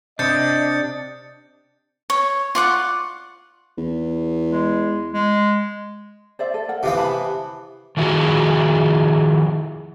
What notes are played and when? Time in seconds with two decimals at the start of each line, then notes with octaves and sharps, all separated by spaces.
0.19 C3 D4 D#5 G6 A6 C#7
2.10 C#5
2.55 F4 D5 F#5 C#6
3.78 E2
4.49 G#3
5.13 G#3
6.39 C5 D5 E5
6.54 A4
6.69 A#4 F#5
6.83 C3 E3 B3 F4 F5
6.97 A5 B5
7.97 D#3 F3 E4 F#4 G#4